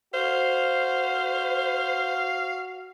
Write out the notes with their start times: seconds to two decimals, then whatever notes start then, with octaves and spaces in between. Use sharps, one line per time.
0.14 F#4 C5 F5